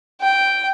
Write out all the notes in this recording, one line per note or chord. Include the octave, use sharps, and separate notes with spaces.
G5